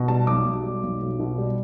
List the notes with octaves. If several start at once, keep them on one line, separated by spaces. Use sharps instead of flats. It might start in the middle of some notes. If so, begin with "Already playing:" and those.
Already playing: B2
G3 A5
B1 D6
B1
G3
B1
B1
B2
G3